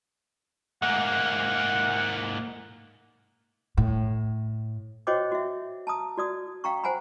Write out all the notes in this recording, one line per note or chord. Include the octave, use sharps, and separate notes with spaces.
G#2 A#3 F#5
A2
F#4 C5 C#5 D#5 G5 D6
F#4 E5
A5 A#5 D#6
F#4 D5 D#6
F5 G5 A#5 C#6
C5 F#5 G#5 A#5 B5